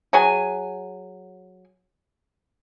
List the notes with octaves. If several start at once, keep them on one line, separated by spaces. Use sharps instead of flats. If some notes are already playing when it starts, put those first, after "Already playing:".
F#3 G#4 F#5 G#5